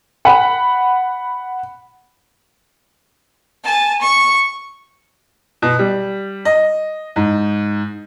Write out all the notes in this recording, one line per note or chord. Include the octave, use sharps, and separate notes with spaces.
F#5 B5
G#5 A5
C#6
B2
G3
D#5
G#2